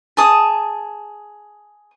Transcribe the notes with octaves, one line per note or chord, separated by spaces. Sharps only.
G#4 A5 D#6